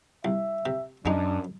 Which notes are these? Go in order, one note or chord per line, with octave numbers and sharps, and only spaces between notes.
C2 E5
C3
F#2 G#3 D4 D#4